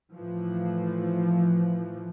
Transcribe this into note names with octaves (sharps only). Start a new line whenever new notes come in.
A2 E3 F3